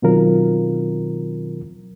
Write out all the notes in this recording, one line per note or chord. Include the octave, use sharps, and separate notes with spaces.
B2 D#3 F#3 C4 F4 A#4